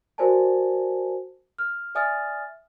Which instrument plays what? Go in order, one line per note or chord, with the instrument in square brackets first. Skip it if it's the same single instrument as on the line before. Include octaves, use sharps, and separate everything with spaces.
[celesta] F#4 A#4 C5 D5 G#5 A5
F6
D5 E5 G#5 D#6 F6 A6